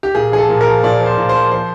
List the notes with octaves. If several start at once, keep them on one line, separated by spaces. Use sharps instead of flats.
G4
A#2 G#4
F3 G#4
A4
A#2
A#4
F3
A#2 D5
F3
C5
A#2
C5
F3
F3 C5